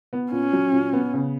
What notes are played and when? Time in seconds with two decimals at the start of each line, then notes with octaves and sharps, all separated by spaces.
0.13 B3
0.32 A#2 C#4
0.53 F#3
0.72 A#2
0.93 B3
1.14 C#3